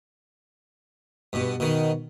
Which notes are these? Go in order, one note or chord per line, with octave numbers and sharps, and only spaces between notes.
G2 B2
B2 D#3